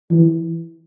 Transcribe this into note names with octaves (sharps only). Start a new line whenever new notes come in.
E3